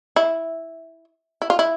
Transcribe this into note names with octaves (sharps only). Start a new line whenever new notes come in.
E4
E4
F4
E4